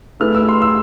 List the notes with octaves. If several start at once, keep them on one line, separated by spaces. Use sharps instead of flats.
A3 E4 G#4 B4 F6
E6
C6
E6